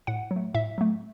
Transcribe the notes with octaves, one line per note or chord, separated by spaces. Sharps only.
A2 F#5
F#3
A3
A2 E5
F#3 A3